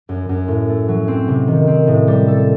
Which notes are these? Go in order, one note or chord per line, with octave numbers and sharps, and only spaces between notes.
F#2
F#2
A2
A3
F#3
C4
C3
D#3
C4
A2
G3
A4